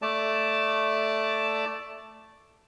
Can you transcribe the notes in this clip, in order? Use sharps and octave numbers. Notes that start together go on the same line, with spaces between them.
A3 D5 A5